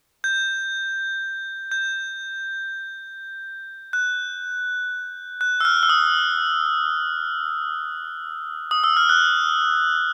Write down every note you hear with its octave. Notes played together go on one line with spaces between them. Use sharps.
G6
G6
F#6
F#6
E6
F6
E6
D#6
D#6
E6
F6
F#6